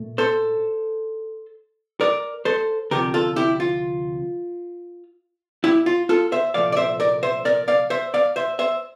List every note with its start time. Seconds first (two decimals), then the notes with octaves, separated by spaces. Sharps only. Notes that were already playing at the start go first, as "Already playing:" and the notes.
Already playing: A#2 A3
0.18 A4 C5
2.01 A#4 D5
2.45 A4 C5
2.91 D2 C3 F3 G4 A#4
3.14 F4 A4
3.36 E4 G4
3.60 F4
5.64 E4 G4
5.86 F4
6.09 F4 A4
6.32 C5 E5
6.54 C2 A#2 F3 A3 D5 F5
6.72 D5
6.77 C5 E5
7.00 A#4 D5
7.23 C5 E5
7.45 A#4 D5
7.68 D5 F5
7.90 C5 E5
8.14 D5 F5
8.36 C5 E5
8.59 C5 E5